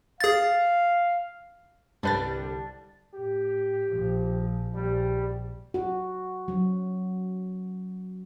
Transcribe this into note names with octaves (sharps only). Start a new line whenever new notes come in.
G#4 F5 A6
C2 G2 D3 G3 D4 B4 A6
A2 G4
A#1 F3
A#1 G3
F#4
F#3